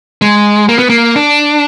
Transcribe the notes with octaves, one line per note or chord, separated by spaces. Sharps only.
G#3
A#3
B3
A#3
D4